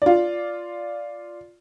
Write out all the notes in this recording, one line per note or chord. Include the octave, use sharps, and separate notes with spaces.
F4 D5